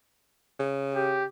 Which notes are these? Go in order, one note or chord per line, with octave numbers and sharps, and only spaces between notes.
C#3
G4